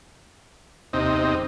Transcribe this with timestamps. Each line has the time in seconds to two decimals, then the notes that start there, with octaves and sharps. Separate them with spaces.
0.93 D#2 C3 D#4
1.12 E2
1.33 D#1